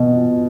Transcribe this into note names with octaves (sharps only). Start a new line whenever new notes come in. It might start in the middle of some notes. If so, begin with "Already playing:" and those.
Already playing: B2